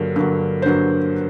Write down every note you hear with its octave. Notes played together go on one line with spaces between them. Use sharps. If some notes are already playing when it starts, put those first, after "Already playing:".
Already playing: G2 D3 F#3 A#3
G2 D3 F#3 A#3
C5
G2 D3 F#3 A#3 B4